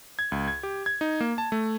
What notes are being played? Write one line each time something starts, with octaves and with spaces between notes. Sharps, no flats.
G#6
C#2
G#6
G4
G#6
D#4
A#3
A5
A3